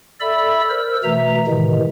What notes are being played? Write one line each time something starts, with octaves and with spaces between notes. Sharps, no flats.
A4 D5 E5 B5 E6
A#4 C5 E6
B2 E3 A3 E5 A#5
A2 C3 D#3 E3 G#3